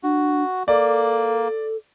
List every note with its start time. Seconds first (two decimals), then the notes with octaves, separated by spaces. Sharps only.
0.03 D4 F#4
0.68 A#3 A4 D5